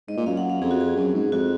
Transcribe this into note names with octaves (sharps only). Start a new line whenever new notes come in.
G#2 D#5
A#2
F#2 F5
F#5
F5
F2 G#4
F#4
G#4
F#2
G#2
F2 F#4